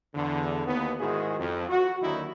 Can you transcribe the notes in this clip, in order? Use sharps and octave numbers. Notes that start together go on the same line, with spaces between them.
E2 D3
D#2 B3
G#2 D#3 E4 F#4 G#4
F2
F#4
D#2 D3 D#3 F#3 D#4 E4